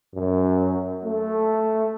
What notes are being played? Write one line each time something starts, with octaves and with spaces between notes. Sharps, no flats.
F#2
A3